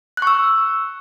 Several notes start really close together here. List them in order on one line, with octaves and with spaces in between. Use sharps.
F#6 C#6 E6